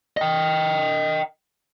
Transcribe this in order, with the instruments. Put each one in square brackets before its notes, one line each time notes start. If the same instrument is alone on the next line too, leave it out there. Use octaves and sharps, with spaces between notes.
[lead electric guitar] D#5 G5